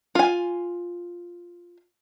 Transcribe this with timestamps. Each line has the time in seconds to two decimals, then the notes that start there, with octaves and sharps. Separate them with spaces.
0.15 F4 G#5